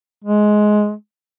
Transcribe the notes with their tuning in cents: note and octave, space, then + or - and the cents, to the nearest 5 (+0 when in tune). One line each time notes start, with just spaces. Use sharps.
G#3 +15